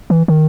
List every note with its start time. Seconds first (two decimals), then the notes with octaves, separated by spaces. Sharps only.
0.10 E3
0.28 D#3